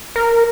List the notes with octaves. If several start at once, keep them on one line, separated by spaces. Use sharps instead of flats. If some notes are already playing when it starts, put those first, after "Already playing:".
A#4